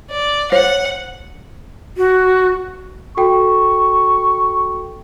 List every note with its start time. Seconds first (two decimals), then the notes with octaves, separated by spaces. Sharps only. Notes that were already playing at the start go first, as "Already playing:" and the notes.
0.11 D5
0.52 C5 C#5 F#5
1.97 F#4
3.17 F#4 A4 G5 C#6